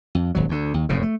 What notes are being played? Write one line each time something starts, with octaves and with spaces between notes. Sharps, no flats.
F2
D#1 G#1 F#3
D2 D3
D#2
F1 F#2 A2 C#3
A3